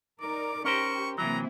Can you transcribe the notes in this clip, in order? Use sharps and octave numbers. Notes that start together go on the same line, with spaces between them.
D#4 A#4 D5 D6
C#4 G4 A#4 C5 C#6
C3 E3 F#3 A#3 C4 E4 A#5